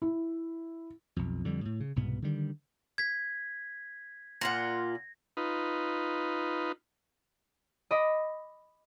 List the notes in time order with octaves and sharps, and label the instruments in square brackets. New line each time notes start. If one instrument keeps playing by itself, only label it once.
[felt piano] E4
[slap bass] B1 F2
F2 D3 G3
A2
C#3
C2 G#2 B2 B3
D3 D#3 G3
[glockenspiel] G#6 B6
[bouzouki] A#2 F4 F#5 [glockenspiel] A#6
[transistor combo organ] D#4 F4 B4
[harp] D#5 B5 D6 A#6